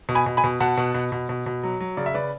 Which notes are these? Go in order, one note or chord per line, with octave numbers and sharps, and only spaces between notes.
B2
G#5 B5
B2
G#5 B5
B2
B2 F#5 A5
B2
B2
B2
B2
B2
F#3
F#3
C#3 D5
E5
C#3 B4 D5